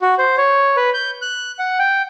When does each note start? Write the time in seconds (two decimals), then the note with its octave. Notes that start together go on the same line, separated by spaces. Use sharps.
0.02 F#4
0.18 C5
0.38 C#5
0.77 B4
0.94 G6
1.22 F#6
1.59 F#5
1.79 G5